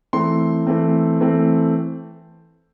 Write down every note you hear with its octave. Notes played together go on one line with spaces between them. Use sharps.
E3 A3 C4 C6
E3 A3 C4
E3 A3 C4